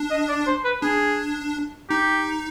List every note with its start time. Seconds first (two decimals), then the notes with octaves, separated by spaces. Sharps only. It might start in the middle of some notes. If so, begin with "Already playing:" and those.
Already playing: D4
0.11 D#5
0.29 D5
0.47 C5
0.64 B4
0.82 D4 G#4
1.89 D#4 G4